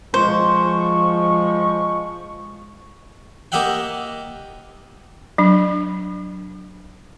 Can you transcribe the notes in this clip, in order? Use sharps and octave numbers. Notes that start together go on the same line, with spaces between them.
F3 G#3 C5 C#6
A#3 G4 D#5 E5 F#5 G5
F#3 D4